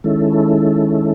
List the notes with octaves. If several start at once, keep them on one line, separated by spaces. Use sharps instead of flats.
D#3 G#3 C#4 E4 A4